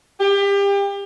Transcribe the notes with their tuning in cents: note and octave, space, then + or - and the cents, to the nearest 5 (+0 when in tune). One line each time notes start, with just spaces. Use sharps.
G4 +30